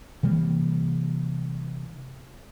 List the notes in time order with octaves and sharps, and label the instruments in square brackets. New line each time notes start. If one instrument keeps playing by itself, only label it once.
[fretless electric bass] C3 E3 G3 A#3